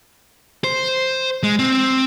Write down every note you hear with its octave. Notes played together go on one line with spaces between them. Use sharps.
C5
G#3
C4